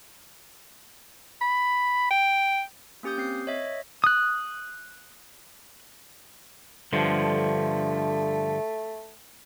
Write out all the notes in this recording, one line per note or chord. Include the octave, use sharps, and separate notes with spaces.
B5
G5
A#3 C#4 G4 D#6 G6
C4 C7
C#5 D#5 E5
D#6 F#6
G2 D3 F3 A3